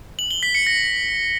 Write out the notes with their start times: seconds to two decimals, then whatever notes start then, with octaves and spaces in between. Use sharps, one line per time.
0.19 F#7
0.31 G7
0.43 B6
0.55 C#7
0.67 A#6